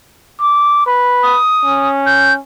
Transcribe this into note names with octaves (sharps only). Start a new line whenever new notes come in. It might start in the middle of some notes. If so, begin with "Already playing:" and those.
D6
B4
D#6
C#4
G6